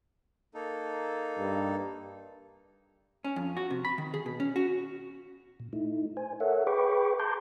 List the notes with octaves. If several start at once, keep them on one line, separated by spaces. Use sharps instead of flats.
A#3 D#4 A4
G2
C#4
F2
F#4
C3
B5
D#3
G#4
B2
C#4
F#4
A#2
A3 D#4 E4
C5 G#5
A4 A#4 C#5 E5 F#5
G#4 B4 G5 B5 C#6 D6
A5 A#5 C6 D6 G6